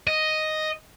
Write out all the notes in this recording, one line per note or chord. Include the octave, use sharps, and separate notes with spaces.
D#5